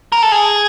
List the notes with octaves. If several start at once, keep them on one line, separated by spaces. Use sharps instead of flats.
A#4
A4
G#4